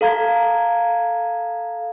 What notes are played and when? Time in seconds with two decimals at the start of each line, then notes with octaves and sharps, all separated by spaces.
0.01 A4 F5 A#5 G#6